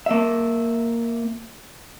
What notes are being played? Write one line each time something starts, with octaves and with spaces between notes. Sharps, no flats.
A#3 E5